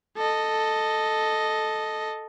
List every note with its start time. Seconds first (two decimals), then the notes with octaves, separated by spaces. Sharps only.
0.17 A4 D#5